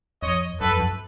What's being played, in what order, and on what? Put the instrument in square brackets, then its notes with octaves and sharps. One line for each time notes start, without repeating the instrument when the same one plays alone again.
[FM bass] F2 [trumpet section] C#5 D#5
[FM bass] F#2 [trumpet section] A4 B4
[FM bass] F2
F#2